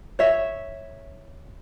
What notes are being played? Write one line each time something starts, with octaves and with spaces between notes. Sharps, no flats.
C#5 E5